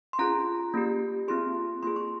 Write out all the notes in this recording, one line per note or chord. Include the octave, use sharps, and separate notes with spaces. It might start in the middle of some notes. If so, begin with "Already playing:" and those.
C6
C#4 F4 G#4 A#5
A#3 C#4 G4
C4 F4 G#4 C6
A#3 F4 G#4 C6
C#6